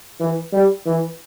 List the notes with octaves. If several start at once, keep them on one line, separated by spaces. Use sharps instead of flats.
E3
G3
E3